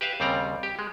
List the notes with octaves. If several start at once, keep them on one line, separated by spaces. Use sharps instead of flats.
G4 B4 E5 F5
D#2 C#3 G3 C4 D5 A#5
G4
G#3